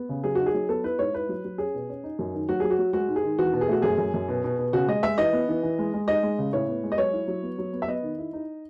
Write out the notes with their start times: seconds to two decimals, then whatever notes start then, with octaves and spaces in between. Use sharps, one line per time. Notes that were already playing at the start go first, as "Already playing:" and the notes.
Already playing: B3
0.09 C#3
0.24 F#3 G#4
0.35 D#4 F#4
0.46 G#4
0.54 F#3
0.69 B3 A4
0.84 E4 B4
0.99 G#2 C#5
1.13 E4 B4
1.29 F#3
1.44 F#3
1.58 C#4 G#4
1.74 B2
1.89 C#4
2.04 D#4
2.19 F#2
2.34 D#3
2.49 F#3 F#4
2.60 F#3 G#4
2.70 F#4
2.79 F#3
2.93 G#3 F#4
3.08 G#2
3.16 G#4
3.23 D#3
3.38 E2 F#4
3.53 B2
3.61 G#4
3.68 A3 F#4
3.82 F#2 G#4
3.98 F#2
4.14 F#2
4.28 B2
4.44 B2
4.59 B2
4.73 C#3 F#4
4.88 G#3 D#5
5.03 G#3 E5
5.18 E3 D#5
5.33 B3
5.49 E3
5.63 E3
5.79 G#3
5.94 G#3
6.08 D#4 D#5
6.23 G#3
6.39 C#3
6.53 A2 C#5
6.68 B3
6.83 G#3
6.92 D#5
6.98 F#3 C#5
7.13 E4
7.28 F#3
7.43 B3
7.58 F#3
7.73 B3
7.82 E5
7.87 B3 D#5
8.03 D#3
8.18 E4
8.33 D#4